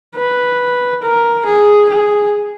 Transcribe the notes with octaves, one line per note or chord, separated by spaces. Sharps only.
B4
A#4
G#4
G#4